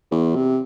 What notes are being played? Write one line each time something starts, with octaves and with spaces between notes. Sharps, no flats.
E2
C3